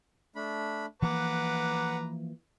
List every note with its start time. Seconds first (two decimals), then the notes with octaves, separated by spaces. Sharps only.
0.36 A3 D4 B5
1.02 E3 F3 A#3 B4 F#5 A#5 D6